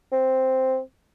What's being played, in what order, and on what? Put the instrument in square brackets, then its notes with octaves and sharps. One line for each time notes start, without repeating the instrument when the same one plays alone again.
[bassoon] C4